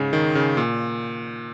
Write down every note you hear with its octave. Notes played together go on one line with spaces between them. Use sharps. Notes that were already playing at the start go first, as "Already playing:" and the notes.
Already playing: G#2 C#3
D#3
C#3
A#2